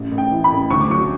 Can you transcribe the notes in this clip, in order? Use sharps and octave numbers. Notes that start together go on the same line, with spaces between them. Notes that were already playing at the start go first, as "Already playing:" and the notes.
Already playing: A1
A1
G5
E3
B5
A1
D2 C#6
D6
F#3 C#6